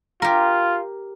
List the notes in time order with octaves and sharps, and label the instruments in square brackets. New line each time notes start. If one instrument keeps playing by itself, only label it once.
[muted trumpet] F4 [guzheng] G4 A#4